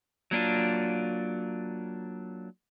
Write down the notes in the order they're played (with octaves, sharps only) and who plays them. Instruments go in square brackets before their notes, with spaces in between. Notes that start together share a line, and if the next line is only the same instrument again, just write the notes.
[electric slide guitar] F#3 A#3 D4 F4